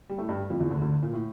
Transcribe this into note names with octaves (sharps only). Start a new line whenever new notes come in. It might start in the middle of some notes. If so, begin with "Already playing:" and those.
G3
A2 A3
G2 G3
F2 F3
E2 E3
D2 D3
D2 D3
A#2
A2